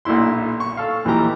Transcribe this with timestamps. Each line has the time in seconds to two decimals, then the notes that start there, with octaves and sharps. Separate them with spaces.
0.05 B1 A#2 D4 E4 C6
0.60 C#6
0.77 A4 F5
1.05 D#2 E3 F3 E4 G4 A#5